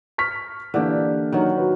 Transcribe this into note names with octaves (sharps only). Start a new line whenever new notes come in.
C#6 F6 B6
D3 E3 A#3 D4 G4
D#3 F#3
F#4 B4